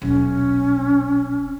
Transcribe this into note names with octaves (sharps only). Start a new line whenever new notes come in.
D#1 B1 C#4